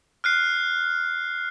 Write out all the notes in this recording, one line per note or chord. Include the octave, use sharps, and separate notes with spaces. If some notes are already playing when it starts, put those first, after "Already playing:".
F6 F#6 C7